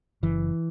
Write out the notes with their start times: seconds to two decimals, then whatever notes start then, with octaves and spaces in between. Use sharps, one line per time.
0.23 F#1 E3